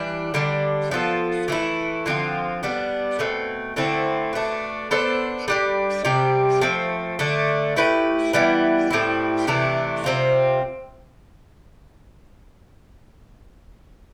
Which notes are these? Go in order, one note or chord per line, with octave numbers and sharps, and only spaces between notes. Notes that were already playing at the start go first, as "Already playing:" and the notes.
Already playing: E3 G3 D4
D3 G3 D4
F3 B3 F4 A4
E3 A3 E4
D3 F3 C4 F4
G3 B3 D4
B2 A3 C4
D3 A3 C4 E4
B2 A3 D4
B3 D4 A4 C5
G3 D4 G4
C3 G3 C4 G4
F3 A3 C4
D3 A3 D4
A3 E4 G4 B4
E3 G3 B3 E4
A2 G3 C4 E4
C3 E3 A3 D4
C3 G3 C4 F4